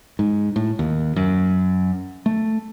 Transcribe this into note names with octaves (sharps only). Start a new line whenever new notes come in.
G#2
A2
D#2
F#2
A3